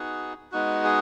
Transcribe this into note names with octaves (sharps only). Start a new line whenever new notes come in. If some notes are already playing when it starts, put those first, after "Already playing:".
Already playing: B3 D#4 F#4 G#4
G#3 B3 D#4 F#4
G#4